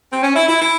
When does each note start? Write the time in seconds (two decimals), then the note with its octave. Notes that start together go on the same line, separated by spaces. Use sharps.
0.11 C4
0.23 C#4
0.36 E4
0.49 E4
0.61 E4